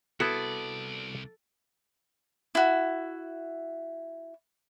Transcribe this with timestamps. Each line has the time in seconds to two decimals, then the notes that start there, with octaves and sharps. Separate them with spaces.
0.20 C2 B3 E4 F#4 A4 D5
2.55 E4 F#4